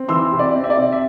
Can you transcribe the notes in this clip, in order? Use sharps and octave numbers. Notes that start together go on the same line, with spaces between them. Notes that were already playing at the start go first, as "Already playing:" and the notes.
Already playing: C4
E3 C6 E6
C3
D5
C4
E5
D5
C3
E5